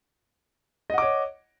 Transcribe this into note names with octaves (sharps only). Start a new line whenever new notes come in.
C#5 D#5 F#5 D6